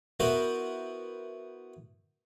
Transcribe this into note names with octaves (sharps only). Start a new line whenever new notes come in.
B3 E4 F#4 A#4 C5